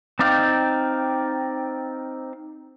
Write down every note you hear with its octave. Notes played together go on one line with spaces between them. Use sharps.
C4 D#4 D5 F5 G5